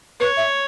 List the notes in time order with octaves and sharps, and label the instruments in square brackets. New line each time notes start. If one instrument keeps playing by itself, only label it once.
[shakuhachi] B4 [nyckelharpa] C#5
[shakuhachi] E5